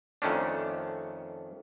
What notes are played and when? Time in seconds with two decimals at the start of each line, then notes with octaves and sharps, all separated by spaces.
0.22 F2 D#3 A3 C#4 D4